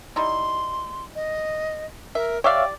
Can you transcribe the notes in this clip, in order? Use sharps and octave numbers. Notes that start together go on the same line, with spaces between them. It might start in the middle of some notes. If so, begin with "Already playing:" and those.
G3 D#4 E4 C6
D#5
A#4 E5
G4 C#5 D5 E5 F5 G5